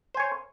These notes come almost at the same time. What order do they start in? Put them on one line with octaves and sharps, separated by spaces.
C5 G#5 C#5